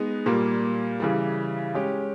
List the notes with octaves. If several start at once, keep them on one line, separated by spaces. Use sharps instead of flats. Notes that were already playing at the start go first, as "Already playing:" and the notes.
Already playing: G#3 B3 D#4 G#4
A#2 G3 A#3
C#3 E3 G3
G#3 C#4 G4